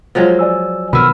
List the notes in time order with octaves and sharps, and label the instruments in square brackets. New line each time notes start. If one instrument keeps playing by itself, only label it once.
[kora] F3 F#3 G#3
[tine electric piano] D5 G#5 E6
[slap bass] B2 D#3 [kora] B3 [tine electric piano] B5 E6 F6